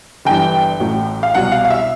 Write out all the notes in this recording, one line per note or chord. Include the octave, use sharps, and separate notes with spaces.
G1 G2 E3 G5
A1 A2 F#3
F5
C2 B2 F#3 F#5
F5
F5
E5